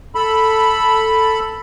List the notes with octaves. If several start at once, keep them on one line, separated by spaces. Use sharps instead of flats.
A4 B5